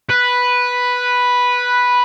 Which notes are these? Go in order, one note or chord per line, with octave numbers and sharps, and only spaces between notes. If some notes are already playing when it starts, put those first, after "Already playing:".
B4